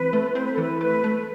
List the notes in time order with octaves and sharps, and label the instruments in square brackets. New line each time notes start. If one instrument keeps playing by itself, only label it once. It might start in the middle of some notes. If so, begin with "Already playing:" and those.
Already playing: [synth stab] E3 C4 [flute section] B4
[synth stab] A3
[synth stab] C4 [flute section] C5
[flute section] B4
A4
[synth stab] E3 [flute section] B4
[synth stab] A3 [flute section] B4
[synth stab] A3